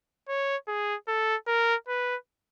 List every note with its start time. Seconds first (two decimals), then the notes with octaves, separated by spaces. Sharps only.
0.29 C#5
0.68 G#4
1.08 A4
1.47 A#4
1.89 B4